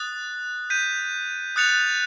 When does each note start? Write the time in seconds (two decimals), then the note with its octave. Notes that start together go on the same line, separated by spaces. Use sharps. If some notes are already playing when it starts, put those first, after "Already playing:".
Already playing: D#6 F#6 A6
0.70 G6 B6 D#7
1.56 D#6 F#6 A6 C#7 F7